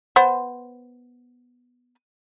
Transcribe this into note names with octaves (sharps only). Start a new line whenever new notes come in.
B3 C5